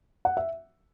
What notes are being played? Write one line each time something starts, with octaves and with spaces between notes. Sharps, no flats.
F#5
E5